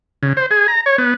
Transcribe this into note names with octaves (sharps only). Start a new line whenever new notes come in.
C#3
C5
G#4
A#5
C#5
B3